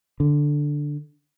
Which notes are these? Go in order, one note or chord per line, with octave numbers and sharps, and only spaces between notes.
D3